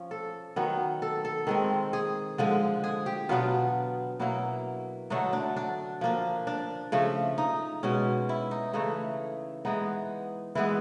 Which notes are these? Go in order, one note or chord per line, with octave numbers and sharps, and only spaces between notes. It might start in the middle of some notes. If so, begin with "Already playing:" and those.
Already playing: F3 C#4
A4
D#3 F#3 B3
A4
A4
D#3 G#3 C4
G#4
D3 F3 G#3
G#4
G4
B2 F#3 B3 D4 F4
B2 F#3 A#3 E4
D3 F#3 A3 D4 D#4
D4
D4
F3 A#3 D4
D4
C#3 F3 A3
D#4
B2 G#3 C#4
E4
D#4
C#3 E3 A3 D#4
E3 G#3 B3 D#4
E3 G#3 B3 E4